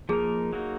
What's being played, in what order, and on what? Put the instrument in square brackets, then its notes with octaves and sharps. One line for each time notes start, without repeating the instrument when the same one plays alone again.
[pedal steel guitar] F3 A#3 D#4 A#4 [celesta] G#4
[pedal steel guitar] F#3 A#3 D#4 F#4